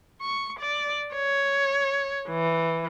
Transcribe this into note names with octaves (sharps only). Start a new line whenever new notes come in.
C#6
D5
C#5
E3